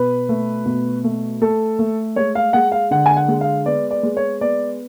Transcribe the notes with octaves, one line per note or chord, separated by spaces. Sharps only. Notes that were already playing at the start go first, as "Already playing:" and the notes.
Already playing: B2 B4
A3
B2
A3
A3 A4
A3
G#3 C#5
F5
G#3 F#5
F5
D3 F#5
G#5
F#5
G#3
F5
B3 D5
D5
G#3
C#5
B3 D5